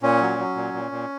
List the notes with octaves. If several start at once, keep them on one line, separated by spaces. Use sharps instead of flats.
A#2 C#4
F#3
F#3
A#2
A#2
A#2